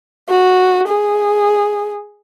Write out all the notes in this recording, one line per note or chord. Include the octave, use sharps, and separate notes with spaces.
F#4
G#4